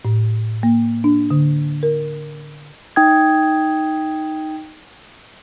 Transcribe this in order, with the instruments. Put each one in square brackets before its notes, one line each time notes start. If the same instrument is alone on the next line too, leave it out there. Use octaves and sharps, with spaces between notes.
[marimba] A2
A#3
D4
D3
A#4
[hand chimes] D#4 G5 D#6 G#6